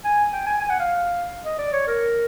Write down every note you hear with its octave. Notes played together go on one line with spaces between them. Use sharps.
G#5
G5
G#5
G#5
F#5
F5
D#5
D5
C#5
A#4